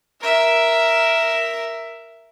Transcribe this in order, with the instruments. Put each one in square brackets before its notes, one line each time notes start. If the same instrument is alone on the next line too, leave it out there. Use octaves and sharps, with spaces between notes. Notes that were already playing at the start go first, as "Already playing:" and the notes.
[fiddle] A#4 E5